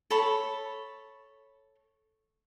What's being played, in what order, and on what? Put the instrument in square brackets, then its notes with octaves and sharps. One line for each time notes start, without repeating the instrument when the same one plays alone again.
[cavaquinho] A4 C#5 A5 B5